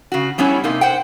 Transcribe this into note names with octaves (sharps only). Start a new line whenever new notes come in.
C#3 F#4
G3 B3 C#4 E4 C#5
C3 A#3 D#4
C5 F#5 G5